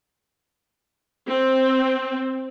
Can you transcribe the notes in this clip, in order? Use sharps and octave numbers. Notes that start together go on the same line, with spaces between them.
C4